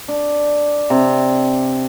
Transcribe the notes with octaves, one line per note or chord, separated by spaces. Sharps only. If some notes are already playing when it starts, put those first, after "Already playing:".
D4
C3